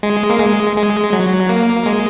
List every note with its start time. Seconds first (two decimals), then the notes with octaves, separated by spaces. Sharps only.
0.03 G#3
0.30 A#3
0.39 G#3
0.76 G#3
1.13 F#3
1.49 A#3
1.86 G#3